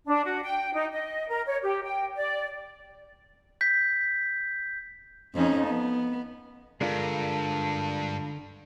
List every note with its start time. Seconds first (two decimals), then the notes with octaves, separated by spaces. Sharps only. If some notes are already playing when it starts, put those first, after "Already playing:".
0.07 D4
0.25 F#4
0.43 G5
0.74 D#4
0.92 D#5
1.29 A#4
1.47 C#5
1.62 G4
1.84 G5
2.17 D5
3.61 G6 B6
5.35 F2 C#4 D#4
5.67 B3
6.81 G2 D3 G#3 D4 F4 A#4 A5